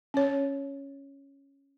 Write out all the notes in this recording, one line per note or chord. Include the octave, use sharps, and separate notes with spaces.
C#4 C#5